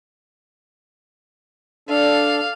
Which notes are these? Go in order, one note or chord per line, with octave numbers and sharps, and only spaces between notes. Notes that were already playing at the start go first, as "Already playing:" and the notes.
D4 A4 F5